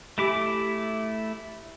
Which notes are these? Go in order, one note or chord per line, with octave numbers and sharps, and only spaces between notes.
A3 E4 G4 G#5 B5 D6